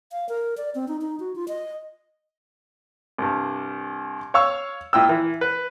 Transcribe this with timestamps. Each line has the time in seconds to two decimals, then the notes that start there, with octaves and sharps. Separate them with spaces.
0.12 F5
0.29 A#4
0.57 D5
0.75 C4
0.88 D#4
1.01 D#4
1.20 F#4
1.36 F4
1.48 D#5
3.18 C2 G2
4.34 C#5 F5 C#6 E6
4.93 A#2 E4 G5 E6
5.09 E3
5.41 B4